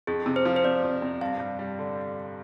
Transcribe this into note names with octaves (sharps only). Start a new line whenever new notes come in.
F2 G#4
C3
C5
F3
C5
C3 D5
F2
C3
G2 F5
G2
G3
D3